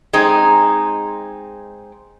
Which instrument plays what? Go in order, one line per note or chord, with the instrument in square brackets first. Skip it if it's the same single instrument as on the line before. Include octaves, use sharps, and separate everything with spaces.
[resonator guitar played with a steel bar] G#3 C4 D#4